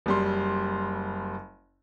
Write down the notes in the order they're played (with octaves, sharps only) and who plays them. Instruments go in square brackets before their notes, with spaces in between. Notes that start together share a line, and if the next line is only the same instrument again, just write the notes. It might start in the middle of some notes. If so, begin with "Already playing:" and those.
[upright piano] F#1 G3 C6